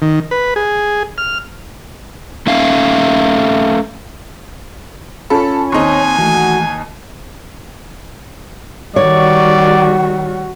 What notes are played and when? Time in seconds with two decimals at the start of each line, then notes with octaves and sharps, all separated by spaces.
0.02 D#3
0.31 B4
0.56 G#4
1.18 F6
2.47 A3 C#4 E5 F5
5.30 C#4 F4 A4 B5
5.72 D#2 C4 D#4 G#5 C6 C#6
6.18 E3 A3 F#4
8.96 D#3 G3 F#4 C#5 D5